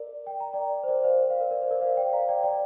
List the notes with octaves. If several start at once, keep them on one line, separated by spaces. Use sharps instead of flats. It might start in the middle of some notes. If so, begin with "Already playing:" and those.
Already playing: A#4 D5
G5
A#5
D5 G5
C5
A#4 D5
C5 F5
C5 F5
A#4 D5
A#4 D5
C5
A#4 D5
C5 F5
D5 G5
F5 A#5
D5 G5
D5 G5